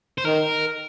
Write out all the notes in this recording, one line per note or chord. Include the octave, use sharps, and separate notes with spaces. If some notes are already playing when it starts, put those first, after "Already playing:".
C5
D#3 A#4